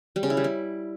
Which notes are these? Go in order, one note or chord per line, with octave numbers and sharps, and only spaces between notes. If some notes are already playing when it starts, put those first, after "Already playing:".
G3
C#3
E4
G3
E4